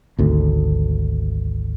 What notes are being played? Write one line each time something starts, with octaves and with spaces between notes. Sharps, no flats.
G#1 D2